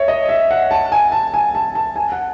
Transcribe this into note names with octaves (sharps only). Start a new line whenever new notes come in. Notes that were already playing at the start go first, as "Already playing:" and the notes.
Already playing: C#5 E5
D#5
E5
F#5
A5
G#5
A5
G#5
A5
A5
G#5
F#5